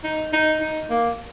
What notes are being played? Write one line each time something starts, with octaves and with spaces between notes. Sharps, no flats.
D#4
D#4
D#4
A#3